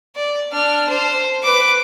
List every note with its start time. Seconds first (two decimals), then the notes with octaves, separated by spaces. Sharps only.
0.16 D5
0.52 D4 F6
0.89 C5
1.43 B4 D6